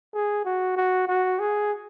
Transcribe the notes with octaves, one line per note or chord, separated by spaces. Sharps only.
G#4
F#4
F#4
F#4
G#4